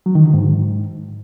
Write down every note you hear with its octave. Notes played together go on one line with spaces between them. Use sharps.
F#3
D#3
D3
G#2